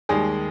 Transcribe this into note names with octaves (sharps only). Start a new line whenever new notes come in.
D#2 D#3 G3 G#3 G#4